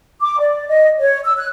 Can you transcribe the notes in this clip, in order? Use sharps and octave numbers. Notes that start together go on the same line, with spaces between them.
D6
D5
D#5
C#5
E6
F#6